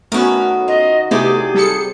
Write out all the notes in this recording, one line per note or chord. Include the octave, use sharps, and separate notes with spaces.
D#3 A3 B3 C#4 F#4 A#4 B4
F4 D#5
C3 A3 B3 E4 G4 G#4 D5
G3 A4 C#7